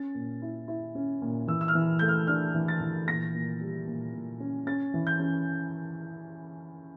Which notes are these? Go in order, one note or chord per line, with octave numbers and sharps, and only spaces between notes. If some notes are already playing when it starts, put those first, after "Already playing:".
Already playing: C#4 A6
A#2
E4
E4
C#4
A#2
E3 E6
E6
F6
E3
A3 G6
F6
D4 F6
E3
A6
E3
A#2 A#6
A#2
G3
A#2
A#2
C#4
C#4 A6
E3
G6
C#4